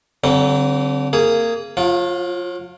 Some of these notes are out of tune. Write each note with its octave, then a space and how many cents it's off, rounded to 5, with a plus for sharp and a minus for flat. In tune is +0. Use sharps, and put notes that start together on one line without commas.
D3 -25 F#3 +45 C4 +0
A#3 -20 G#4 +0
F#3 -45 F4 +0